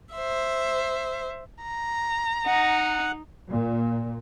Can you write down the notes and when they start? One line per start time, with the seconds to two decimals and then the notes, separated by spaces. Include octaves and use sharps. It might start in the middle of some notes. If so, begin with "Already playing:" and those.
0.14 C5 E5
1.63 A#5
2.46 D#4 F#5
3.48 A#2